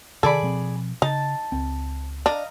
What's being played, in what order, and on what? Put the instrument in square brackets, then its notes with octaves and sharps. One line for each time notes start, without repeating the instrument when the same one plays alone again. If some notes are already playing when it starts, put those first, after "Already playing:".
[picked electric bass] C3 D#3 [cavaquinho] G#4 D5 B5 [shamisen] A4
[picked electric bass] B2 F3 C4
[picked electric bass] C#3 [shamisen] D#4 [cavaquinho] A5
[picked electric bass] C#2 C4
[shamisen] D4 [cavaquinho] D#5 F5 A#5